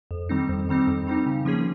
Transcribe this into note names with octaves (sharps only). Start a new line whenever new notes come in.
F2
D#3 G3 C4 D#4
F2
D#3 G3 C4 D#4
F2
D#3 G3 C4 D#4
C#3
F3 A#3 C#4 G#4